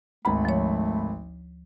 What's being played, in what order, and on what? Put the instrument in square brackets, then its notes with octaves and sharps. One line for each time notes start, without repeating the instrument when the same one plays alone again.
[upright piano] G#1 B5 [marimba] D2 A#5 [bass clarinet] A3
[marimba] F3 C#5